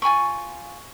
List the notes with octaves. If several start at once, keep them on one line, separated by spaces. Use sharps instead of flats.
F4 G#5 B5 C#6